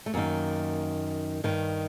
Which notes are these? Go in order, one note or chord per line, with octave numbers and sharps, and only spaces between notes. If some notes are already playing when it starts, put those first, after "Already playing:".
A3
F#2 D#3 A#3
G2 D#3